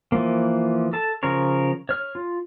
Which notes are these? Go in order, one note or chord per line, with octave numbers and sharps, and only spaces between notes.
E3 F3 A#3
A4 A5
C#3 F3 A#4 C#5
C#5 F6
F4